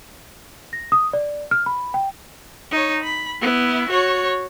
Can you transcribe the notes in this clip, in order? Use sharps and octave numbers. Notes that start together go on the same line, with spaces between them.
A#6
D#6
D5
F6
B5
G5
D#4 C#5
B5
B3 E4
F#4 C#5